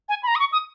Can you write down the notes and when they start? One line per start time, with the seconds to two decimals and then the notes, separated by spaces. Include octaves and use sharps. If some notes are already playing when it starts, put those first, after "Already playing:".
0.09 G#5
0.23 B5
0.27 A#5
0.35 D#6
0.40 C#6
0.52 D#6